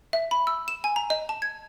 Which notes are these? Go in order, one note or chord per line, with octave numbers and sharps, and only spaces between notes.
E5
B5
E6
E7
G#5
A#5
D#5
A5
G#6